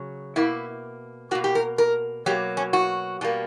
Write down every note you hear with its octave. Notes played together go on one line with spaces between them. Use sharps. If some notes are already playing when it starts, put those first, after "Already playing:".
Already playing: C#3 F#3
B2 A#3 E4
B2 A#3 F#4
G4
A#4
A#4
B2 F#3 A#3 G4
C#4
F#4
B2 G3 A#3